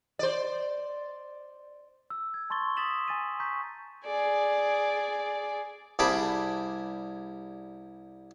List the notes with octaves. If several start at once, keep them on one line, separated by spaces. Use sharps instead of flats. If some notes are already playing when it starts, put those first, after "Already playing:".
C5 D5
E6
G#6
A5 C6 C#6 A6 G7
C6 D#6 A6 B6 E7 F#7
G#5 A6 D#7
A#5 C#6 G6 B6
G#4 D5
C2 G3 G#4 A5 B5 D6